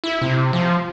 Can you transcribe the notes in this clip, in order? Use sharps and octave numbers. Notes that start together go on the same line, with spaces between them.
E4
C3
F3